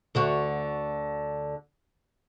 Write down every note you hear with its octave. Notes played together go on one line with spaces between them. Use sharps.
D2 D3 F#4